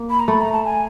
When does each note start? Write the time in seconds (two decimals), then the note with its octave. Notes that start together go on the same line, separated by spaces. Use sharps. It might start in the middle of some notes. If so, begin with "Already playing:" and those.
Already playing: A#3
0.10 B5
0.20 A#5
0.28 A3 B5
0.41 A#5
0.52 A5
0.65 G#5